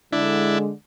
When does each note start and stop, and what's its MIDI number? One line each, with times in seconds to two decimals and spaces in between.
0.13 0.70 50
0.13 0.70 56
0.13 0.58 62
0.13 0.58 64